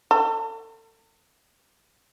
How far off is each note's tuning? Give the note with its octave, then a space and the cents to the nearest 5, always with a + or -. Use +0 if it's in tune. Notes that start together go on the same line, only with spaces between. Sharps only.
A4 +35